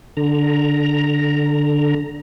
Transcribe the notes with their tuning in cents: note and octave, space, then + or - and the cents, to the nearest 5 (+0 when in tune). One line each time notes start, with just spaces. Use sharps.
D3 +0 A#5 +0